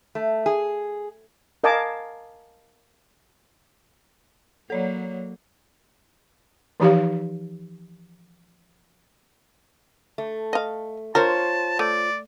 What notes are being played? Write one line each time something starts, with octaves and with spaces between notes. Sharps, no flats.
A3
G#4
A#4 D#5 F5 G#5 A5 D6
F#3 A#3 A4 C#5 D5
E3 F3 D#4 G4 C#5 F5
A3
D#5 F5
F4 A#4 C5 C#5 A5
A3 D5